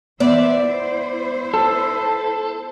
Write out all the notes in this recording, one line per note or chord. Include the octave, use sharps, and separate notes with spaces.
E3 B3 C5 D5 E5
E4 C5
A4